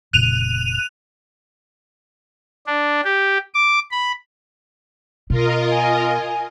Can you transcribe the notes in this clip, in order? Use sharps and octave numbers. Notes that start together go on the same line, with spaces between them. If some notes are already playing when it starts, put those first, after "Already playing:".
F1 A#2 C#3 F#6 D#7 F7
D4
G4
D6
B5
B2 F4 A#4 D#5
G#5